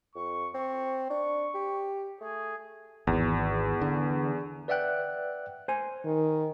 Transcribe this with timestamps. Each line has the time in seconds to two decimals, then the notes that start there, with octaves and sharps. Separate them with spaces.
0.15 F2 C#6
0.54 C4 C#6
1.10 D4 C#6
1.55 G4
2.21 A3 G#4
3.07 G#1 E2
3.81 D3
4.68 B4 D5 E5 F#5 G5 F#6
5.68 C5 G#5
6.05 D#3